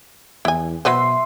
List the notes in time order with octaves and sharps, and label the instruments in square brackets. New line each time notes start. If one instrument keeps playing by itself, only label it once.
[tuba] E2 [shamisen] E4 G#5
[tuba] B2 [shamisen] F#3 B4 C5 [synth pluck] E5 C6